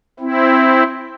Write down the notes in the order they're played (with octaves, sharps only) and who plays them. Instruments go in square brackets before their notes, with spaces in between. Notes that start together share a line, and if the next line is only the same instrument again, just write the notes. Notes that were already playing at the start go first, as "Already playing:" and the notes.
[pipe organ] C4 E4